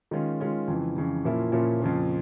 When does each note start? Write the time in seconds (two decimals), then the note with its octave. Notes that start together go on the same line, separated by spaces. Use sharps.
0.11 D#3 G#3 C#4 F4
0.40 D#3 G#3 C#4 F4
0.68 F2 C#3 E3
0.96 F2 C#3 E3
1.24 A#2 F3 A#3 C#4 E4
1.52 A#2 F3 A#3 C#4 E4
1.80 F2 C#3 F3 A#3